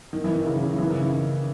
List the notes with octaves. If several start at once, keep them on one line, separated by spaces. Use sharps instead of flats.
D#3
E3
D#3
C#3
D#3
C#3
D#3
E3
C#3
D#3